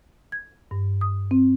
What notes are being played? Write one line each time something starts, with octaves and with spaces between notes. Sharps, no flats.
G#6
G2
D#6
C4